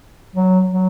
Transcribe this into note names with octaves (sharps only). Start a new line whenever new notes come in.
F#3
F#3